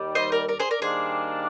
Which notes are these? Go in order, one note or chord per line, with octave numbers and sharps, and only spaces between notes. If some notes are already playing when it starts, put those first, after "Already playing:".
Already playing: D#2 D#3 G3
C5 D#5
A#4 D5
A#4 D5
G#4 C5
A#4 D5
D#3 G3 A#3 D4 G#4 C5